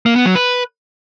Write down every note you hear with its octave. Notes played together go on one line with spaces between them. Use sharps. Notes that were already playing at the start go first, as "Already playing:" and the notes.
A#3
B3
F#3
B4